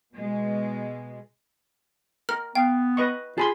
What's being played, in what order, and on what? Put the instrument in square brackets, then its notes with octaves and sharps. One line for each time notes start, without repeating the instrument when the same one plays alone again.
[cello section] B2 G#3
[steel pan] A#4 [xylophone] F6
[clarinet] B3 [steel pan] F5 [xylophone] G5
[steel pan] B4 D#5 C#6
[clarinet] F4 [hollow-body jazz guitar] G#4 [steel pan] A5 B5 C6